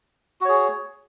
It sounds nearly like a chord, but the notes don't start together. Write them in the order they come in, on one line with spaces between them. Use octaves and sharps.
F#4 C#5 G#4